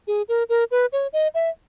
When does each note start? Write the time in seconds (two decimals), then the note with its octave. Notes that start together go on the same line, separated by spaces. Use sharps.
0.07 G#4
0.29 A#4
0.49 A#4
0.71 B4
0.93 C#5
1.13 D#5
1.34 E5